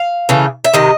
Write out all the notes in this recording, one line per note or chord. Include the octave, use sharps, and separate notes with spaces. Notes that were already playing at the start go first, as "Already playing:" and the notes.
Already playing: F5
C#3 E3 A3
E5
C3 D#3 D#5